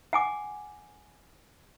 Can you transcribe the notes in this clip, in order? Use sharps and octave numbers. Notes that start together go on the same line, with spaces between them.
F#5 G#5 D6